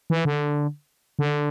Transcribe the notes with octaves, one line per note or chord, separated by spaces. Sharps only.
E3
D3
D3